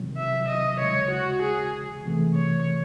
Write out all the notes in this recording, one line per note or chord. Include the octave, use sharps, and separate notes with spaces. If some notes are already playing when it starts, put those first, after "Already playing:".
Already playing: C3 D#3 F#3
E5
D#5
D#2 C#3 G#3 C#5
F#4
G#4
C2 C3 E3 A3
C#5